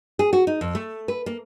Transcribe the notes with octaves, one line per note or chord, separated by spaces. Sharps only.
G#4
F#4
D#4
F2
A3
B4
A#3